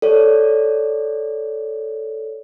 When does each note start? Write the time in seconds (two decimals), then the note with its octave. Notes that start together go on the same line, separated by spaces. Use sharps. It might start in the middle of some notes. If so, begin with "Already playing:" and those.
0.02 A4 C#5 D5